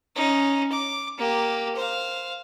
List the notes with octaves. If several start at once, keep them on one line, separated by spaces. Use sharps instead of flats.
C#4 D#4
D6
A#3 G4
C5 F5